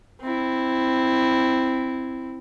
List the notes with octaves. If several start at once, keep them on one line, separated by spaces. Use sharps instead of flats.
C4 E4